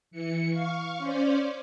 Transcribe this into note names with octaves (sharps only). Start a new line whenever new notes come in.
E3 C#7
F5 C#6
C#4 C5 D5